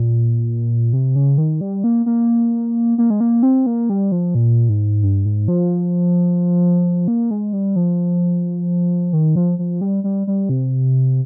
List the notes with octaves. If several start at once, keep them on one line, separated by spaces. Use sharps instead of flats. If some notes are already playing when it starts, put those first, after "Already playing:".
Already playing: A#2
C3
C#3
D#3
G3
A#3
A#3
A#3
G#3
A#3
C4
A#3
G3
F3
A#2
G#2
G2
G#2
F3
A#3
G#3
G3
F3
D#3
F3
F3
G3
G3
G3
C3